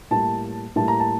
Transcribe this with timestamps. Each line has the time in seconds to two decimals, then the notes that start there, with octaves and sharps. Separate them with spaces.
0.11 A2 G3 A#3 A5
0.76 A2 G3 A#3 A5
0.88 A#5
1.00 A5